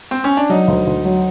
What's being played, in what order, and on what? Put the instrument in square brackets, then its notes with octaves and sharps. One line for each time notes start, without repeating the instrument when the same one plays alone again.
[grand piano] C4
C#4
D4
[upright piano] F#3 [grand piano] D#4
[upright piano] D2
D2
F#3